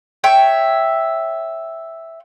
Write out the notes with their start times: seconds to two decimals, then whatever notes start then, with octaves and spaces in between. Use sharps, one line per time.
0.24 C#5 E5 G5 C#6